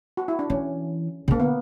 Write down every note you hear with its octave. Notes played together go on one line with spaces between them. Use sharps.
F#4
E4
D4
E3 C#4
C#3
D3 A#3
B3